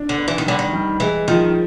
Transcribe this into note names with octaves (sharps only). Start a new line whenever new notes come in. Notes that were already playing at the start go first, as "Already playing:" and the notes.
Already playing: D4
D3
B3
E3
D#3
D3 G3
D#3
G3
E3 G#3
D#3 F3